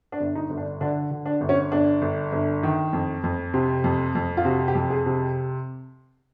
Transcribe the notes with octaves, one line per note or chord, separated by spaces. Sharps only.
D4
G1
D#4
G1
D4
D3 D4
D3
D4
G1
C#4
G1 D4
G1
G1
D#3
F2
F2
C3
F2
F2
F4
C3 F#4
G4
F2
G#4
C3